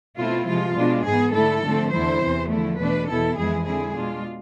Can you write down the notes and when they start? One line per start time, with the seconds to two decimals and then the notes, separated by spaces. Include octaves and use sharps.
0.18 B2 A3 C4 E4 F4
0.47 C3 F3 G#3 F4
0.76 B2 G#3 D4
1.05 G#2 E3 B3 G#4
1.34 D3 A3 E4 A4
1.63 D3 F3 A3 C4
1.92 E2 D3 A3 E4 C5
2.21 E2 C3 E3
2.50 D3 F3 A3 E4
2.79 E2 B2 A3 D4 B4
3.09 E2 B2 B3 E4 A4
3.38 F2 E3 G#3 B3 E4 G#4
3.67 D3 G#3 C4 E4 G#4
3.96 B2 G#3 D4 F4